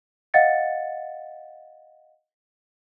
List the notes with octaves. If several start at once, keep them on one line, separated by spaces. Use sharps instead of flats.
D#5 F5 F#5 A6 C#7